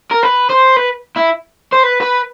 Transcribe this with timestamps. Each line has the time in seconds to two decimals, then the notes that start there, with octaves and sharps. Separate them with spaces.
0.11 A#4
0.23 B4
0.49 C5
0.76 B4
1.16 E4
1.72 C5
1.83 B4
2.01 B4